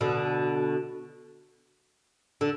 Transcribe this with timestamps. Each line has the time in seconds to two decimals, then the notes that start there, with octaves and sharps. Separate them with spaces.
0.01 B2 D3
2.41 D3